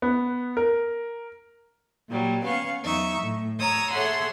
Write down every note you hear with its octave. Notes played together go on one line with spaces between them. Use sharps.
B3
A#4
A#2 F#3 G3
B3 C#4 F5 C#6
E2 F#3 D#4 E5 C#6
A2
C#5 A#5 D#6 E6
G#4 A4 C#5 E5 F#5 C6